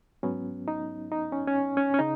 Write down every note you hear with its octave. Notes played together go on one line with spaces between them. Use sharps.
G#2 F#3 B3 C#4
D#4
D#4
C#4
C#4
C#4
C#4
C#3 D#4